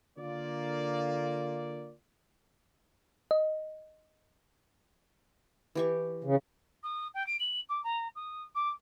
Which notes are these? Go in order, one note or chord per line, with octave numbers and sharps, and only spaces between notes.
D3 A#3 F4 D5
D#5
E3 G4 C#6
C#3
D#6
G5
D7
F#7
D6
A#5
D#6
D6